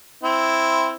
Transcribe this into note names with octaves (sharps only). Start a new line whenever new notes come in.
C4 E4